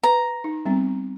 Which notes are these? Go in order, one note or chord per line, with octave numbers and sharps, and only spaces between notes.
B4 A#5
D#4
G3 B3 C4